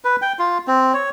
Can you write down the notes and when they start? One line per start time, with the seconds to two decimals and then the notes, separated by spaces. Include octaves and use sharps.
0.04 B4
0.22 G5
0.39 F4
0.67 C4
0.94 C#5